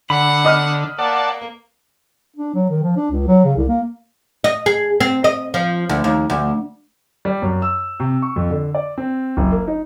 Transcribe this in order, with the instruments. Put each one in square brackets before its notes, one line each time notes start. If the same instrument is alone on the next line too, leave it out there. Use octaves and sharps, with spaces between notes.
[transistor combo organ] D3 [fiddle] F#5 [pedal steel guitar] B5
[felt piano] D#5 D#6 F6
[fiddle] A#3 [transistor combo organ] D5 F#5 A5
[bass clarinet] D4
F#3
D#3
F3
D4
C#2
F#3
C#3
C2
A#3
[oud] D#5
G#4
C4
D#5
F3
D2
D#2
D2
[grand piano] G3
F#2
E6
C3
C#6
F2
D3
D5
C4
F#1
A#3
D#4